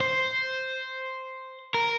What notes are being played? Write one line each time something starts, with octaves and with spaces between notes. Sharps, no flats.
C5
A#4